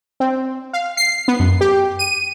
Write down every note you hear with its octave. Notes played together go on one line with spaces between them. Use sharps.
C4
F5
C7
B3
F#2
G4
D#7